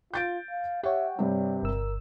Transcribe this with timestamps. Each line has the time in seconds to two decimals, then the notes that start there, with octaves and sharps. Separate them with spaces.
0.14 F4 G6 A6 D7
0.50 F5
0.84 G4 C#5 E5 F#5
1.18 G2 C3 G3
1.63 G1 A#4 E6